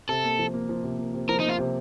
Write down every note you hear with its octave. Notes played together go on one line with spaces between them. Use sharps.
C3 A4
A#3
F3
A#3
F3
C3
A#3
C3
F3 A#4
D#4
A#3
F4
C3